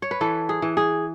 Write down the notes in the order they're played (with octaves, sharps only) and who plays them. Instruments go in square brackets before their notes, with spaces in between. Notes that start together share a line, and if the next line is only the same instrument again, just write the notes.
[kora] C#5
B4
E3 A4
G#4
E3
G#4